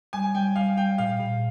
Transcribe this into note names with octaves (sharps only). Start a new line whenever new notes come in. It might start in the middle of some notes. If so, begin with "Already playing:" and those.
G3 G#5
G3 G5
G3 F5
G3 G5
A#2 F5
A#2